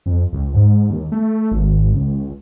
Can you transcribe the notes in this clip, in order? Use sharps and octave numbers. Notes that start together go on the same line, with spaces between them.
F2
C#2
G#2
D#2
A3
G#1
C#2